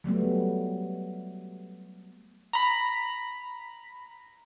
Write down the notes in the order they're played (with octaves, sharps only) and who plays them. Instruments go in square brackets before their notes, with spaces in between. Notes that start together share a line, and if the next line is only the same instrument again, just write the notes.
[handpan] F#3 G3 A3 B3
[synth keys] A#5 B5